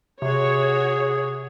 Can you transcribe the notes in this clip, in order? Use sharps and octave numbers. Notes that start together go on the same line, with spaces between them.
C3 F#4 G#4 C#5